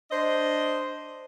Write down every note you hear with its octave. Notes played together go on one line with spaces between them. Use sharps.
D4 C5 D#5